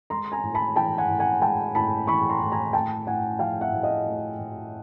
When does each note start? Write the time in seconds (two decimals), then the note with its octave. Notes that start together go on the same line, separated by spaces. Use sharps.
0.10 G#3 A#5 C6
0.32 G#5 A#5
0.43 A2
0.54 A5 B5
0.76 E3 G5 A5
0.98 F#5 G#5
1.09 A2
1.20 F#5 G#5
1.42 G#3 G5 A5
1.75 A2 A5 B5
2.07 E3 B5 C#6
2.30 A#5 C6
2.41 A2
2.52 G#5 A#5
2.73 A3 G5 A5
3.07 A2 F#5 G#5
3.39 F3 F5 G5
3.61 E5 F#5
3.72 A2
3.83 D#5 F5
4.06 A3
4.39 A2